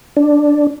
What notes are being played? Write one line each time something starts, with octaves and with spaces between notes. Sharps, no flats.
D4